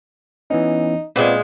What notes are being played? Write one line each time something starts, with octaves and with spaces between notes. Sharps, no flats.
E3 B3 C#4 D#4
A#2 G#3 B3 C4 F4